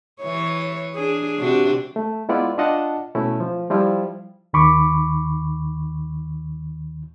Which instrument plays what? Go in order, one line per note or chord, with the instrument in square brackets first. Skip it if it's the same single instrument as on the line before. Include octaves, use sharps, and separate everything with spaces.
[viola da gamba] E3 C#5
D4 G#4
C3 D4 F#4
[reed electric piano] A3
G#3 B3 E4 F4 D5
D4 F4 D#5 F#5 A5
B2 A3 C#4 E4
F3
F3 G3 E4 F4
D#2 D#3 B5 C#6 D6